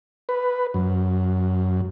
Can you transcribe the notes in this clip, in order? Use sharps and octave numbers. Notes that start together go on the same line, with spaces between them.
B4
F#2